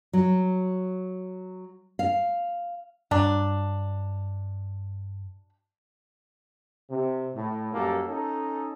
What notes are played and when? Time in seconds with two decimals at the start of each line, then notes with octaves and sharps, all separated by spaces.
0.13 F#3
1.99 F5
3.11 G2 F#3 D4
6.90 C3
7.35 A2
7.73 F#2 G3 A#3 G4 A4
8.08 C#4 D#4 A4